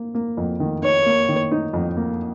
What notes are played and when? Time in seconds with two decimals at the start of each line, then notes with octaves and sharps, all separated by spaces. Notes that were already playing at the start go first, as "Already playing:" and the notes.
Already playing: A#3
0.15 A#3
0.37 F2
0.60 D#3
0.82 D#4 C#5
1.06 A#3
1.29 D#3
1.51 D#4
1.73 F2
1.97 A#3